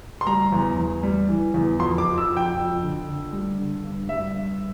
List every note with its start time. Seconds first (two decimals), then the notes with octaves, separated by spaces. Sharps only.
0.21 C6
0.27 G3 A#5
0.52 E2
0.78 E2
1.03 G3
1.29 E3
1.54 E2
1.80 F2 C6
1.98 D6
2.05 F3
2.18 E6
2.31 F2
2.37 G5
2.56 F2
2.82 D3
3.07 D3
3.32 G3
3.58 D3
3.84 G2
4.09 G3 E5
4.34 G2